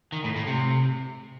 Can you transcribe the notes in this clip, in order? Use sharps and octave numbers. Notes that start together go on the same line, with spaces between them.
D#3
A2
A2
C3